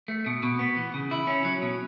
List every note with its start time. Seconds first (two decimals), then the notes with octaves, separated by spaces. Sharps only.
0.08 A3
0.26 B2
0.43 B2
0.59 B3
0.77 E3
0.94 C#3
1.11 E4
1.27 C#4
1.45 F#3
1.62 B2